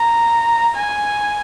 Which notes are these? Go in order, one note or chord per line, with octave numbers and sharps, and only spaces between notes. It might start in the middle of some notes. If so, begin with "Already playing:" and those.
Already playing: A#5
G#5